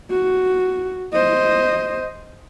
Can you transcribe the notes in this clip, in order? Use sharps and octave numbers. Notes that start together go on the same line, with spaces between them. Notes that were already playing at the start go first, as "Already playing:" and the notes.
F#4
C5 D#5